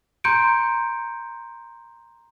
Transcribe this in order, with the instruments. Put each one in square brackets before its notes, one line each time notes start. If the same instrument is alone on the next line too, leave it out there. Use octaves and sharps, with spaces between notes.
[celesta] A#5 C6 G6 C#7 D7